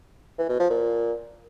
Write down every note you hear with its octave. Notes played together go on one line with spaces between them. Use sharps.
E3
B2
F3
A#2